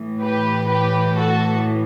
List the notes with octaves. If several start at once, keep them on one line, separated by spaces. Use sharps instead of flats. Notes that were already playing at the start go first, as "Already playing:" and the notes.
Already playing: A2 E3
G4 B4
G4 B4
F#4 A4